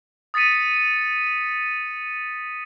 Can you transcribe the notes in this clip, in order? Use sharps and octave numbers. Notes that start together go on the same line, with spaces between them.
D#6 A6 B6 C#7 D#7